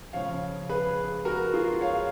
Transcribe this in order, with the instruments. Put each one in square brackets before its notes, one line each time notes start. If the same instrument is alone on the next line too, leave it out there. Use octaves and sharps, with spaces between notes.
[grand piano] C#3 F3 C#5 F5
G#4 B4
F#4 A#4
F4 G#4
C#5 F5